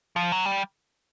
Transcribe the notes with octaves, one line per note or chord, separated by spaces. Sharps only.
F3
F#3
G3